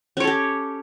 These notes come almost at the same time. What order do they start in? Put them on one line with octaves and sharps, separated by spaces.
C#4 C#5 A4 G4